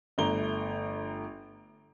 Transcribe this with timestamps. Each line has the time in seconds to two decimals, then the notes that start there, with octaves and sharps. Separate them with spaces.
0.18 G1 A3 A#5 G7